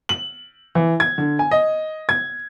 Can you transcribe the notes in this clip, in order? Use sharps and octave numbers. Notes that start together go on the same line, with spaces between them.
F#7
E3
G#6
D3
G#5
D#5
G#6